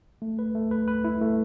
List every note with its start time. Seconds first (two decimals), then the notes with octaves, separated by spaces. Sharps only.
0.22 A3
0.39 B4
0.55 A3
0.71 B4
0.88 B4
1.04 E4
1.21 A3